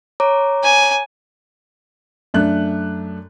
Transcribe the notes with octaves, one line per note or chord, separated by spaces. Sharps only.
C#5 A#5 D6
G#5
F#2 A3 D4 F#6